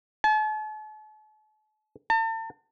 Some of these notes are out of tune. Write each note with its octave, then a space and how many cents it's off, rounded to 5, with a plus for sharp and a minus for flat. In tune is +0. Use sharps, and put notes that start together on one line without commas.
A5 -45
A5 +35